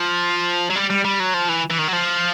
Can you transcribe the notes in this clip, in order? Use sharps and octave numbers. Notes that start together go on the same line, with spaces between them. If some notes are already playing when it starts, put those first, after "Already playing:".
Already playing: F3
F#3
G3
G3
G3
F#3
F3
E3
E3
D#3
F#3
F3